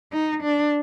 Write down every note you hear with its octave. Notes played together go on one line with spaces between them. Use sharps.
D#4
D4